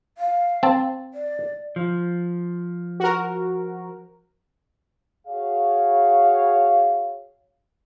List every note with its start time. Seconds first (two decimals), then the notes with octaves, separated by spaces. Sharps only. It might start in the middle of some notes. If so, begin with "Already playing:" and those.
0.18 F5
0.63 C4 A5
1.14 D5
1.76 F3
3.00 F#4 A#4
5.27 F#4 G#4 C#5 F5